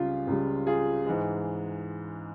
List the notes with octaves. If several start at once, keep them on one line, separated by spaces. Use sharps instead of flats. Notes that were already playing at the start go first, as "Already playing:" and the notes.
Already playing: C#2 C#3 G3 F4
C#2 C#3 G3
F4 G#4
G#2 E3 G#3